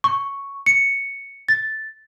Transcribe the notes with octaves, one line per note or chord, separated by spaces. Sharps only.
C#6
C#7
A6